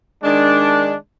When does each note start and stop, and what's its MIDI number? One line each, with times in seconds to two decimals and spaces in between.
0.24 0.95 51
0.24 0.95 56
0.24 0.95 62